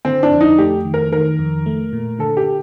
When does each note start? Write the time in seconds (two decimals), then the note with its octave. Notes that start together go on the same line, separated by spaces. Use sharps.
0.05 D3 C4
0.23 D4
0.31 F2
0.41 D#4
0.58 A3 G4
0.85 D#3
0.94 A#4
1.12 D#3 A#4
1.39 F2
1.66 A3
1.93 A#2
2.19 D3 A4
2.37 G4